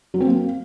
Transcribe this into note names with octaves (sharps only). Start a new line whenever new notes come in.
F#3
C4
A#3